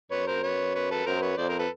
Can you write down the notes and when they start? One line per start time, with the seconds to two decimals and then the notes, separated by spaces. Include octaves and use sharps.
0.11 F#2 B4 C#5
0.27 A#4 C5
0.43 B4 C#5
0.75 B4 C#5
0.91 A4 B4
1.06 F#2 A#4 C5
1.22 B4 C#5
1.37 F2 C5 D5
1.49 A#4 C5
1.59 A4 B4